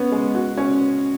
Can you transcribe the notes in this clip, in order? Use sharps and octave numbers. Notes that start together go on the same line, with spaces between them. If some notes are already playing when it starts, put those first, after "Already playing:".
Already playing: B3 C#4
G#3
F#4
C#4